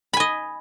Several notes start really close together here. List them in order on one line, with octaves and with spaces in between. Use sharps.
B5 G#5 D#5